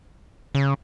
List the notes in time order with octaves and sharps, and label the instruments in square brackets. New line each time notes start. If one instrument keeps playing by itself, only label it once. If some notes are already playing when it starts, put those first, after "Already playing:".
[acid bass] C#3